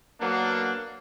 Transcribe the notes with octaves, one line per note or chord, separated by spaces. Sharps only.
F#3 A#3 B3 D4